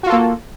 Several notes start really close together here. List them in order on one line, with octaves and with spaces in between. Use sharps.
F#4 F4 A4 A#3